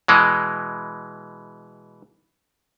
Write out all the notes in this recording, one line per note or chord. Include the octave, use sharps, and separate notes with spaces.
B2 E3 G#3